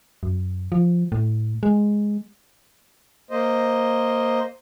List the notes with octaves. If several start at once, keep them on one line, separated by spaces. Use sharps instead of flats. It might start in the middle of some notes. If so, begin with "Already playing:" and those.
F#2
F3
A2
G#3
A#3 C5 D#5